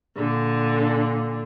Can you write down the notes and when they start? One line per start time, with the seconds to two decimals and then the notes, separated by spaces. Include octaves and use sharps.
0.17 A#2 D3